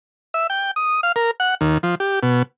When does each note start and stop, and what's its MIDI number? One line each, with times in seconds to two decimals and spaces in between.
0.34 0.47 76
0.50 0.71 79
0.76 1.01 87
1.03 1.12 77
1.16 1.31 70
1.40 1.55 78
1.61 1.78 39
1.83 1.95 53
2.00 2.19 67
2.23 2.42 47